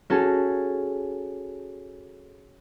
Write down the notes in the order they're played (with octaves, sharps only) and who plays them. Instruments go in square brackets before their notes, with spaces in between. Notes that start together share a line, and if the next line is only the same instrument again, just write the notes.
[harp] C#4 F#4 G#4 A4 G#5 A5